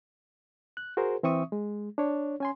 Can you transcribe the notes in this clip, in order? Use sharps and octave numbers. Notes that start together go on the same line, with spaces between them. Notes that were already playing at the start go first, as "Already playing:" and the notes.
F#6
F#4 G#4 A#4 C5
E3 C4 E5 C#6 D#6
G#3
D4 C#5
C#4 G#5 C6